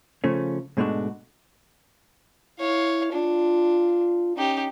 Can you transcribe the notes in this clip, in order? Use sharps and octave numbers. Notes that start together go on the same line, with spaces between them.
C#3 F3 A3 C#4
G#2 B2 G#3 A3 D4 F#4
E4 C#5 F5
D4 F4
C#4 D#4 G4